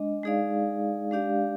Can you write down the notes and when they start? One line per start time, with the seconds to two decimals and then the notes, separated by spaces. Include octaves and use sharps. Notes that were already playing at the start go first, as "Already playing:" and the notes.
Already playing: G#3 D4 D#5
0.23 G#3 D#4 G#4 D5 F5
1.11 G#3 D4 G4 D5 F5